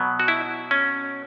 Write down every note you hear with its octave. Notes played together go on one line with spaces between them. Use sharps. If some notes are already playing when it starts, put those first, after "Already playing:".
Already playing: B2 F#3 B3
F#4
E4
C#4